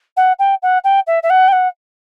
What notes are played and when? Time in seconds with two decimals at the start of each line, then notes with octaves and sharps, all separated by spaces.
0.16 F#5
0.39 G5
0.62 F#5
0.84 G5
1.06 E5
1.23 E5
1.30 F#5
1.48 G5
1.52 F#5